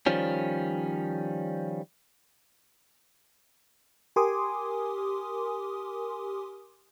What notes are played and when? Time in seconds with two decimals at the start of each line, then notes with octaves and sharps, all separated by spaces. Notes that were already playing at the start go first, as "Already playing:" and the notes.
0.06 D#3 F3 G3 C#4
4.16 G4 A#4 G#5 C6 D6 D#6